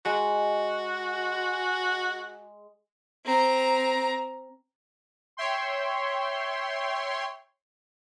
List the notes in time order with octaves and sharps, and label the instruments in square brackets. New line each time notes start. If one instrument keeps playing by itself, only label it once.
[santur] G#3 [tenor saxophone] F#4
[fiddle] C4 A#5
[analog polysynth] C#5 E5 G5 C6